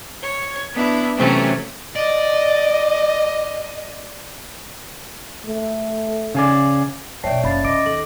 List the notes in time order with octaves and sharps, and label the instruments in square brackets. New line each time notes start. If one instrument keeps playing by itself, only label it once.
[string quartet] C#5
B3 D4 E4
C3 E3 F#3 A3 C4 C#4
[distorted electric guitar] D5 [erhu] D#5
[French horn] A3
[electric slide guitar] C#3 G#4 D5
[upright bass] B1 F#2 [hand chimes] C#5 C7 [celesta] D5 E5 A5 [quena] G5
[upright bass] F#1 [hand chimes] C#4 B5 A6 [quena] F5
[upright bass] C3 [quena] D#5 [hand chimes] D6 D7
[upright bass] D#2 [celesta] A4 F#7